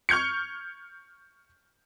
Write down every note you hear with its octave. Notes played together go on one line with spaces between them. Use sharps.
C#6 F6 G6 G#6 C#7